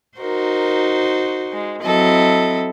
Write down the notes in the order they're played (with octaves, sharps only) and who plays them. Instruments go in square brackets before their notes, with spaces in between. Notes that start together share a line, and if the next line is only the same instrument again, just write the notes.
[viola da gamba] D#4 F#4 C5 [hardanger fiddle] A#4
[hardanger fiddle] G#3
[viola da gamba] F#3 C4 E4 [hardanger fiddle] A4 D#5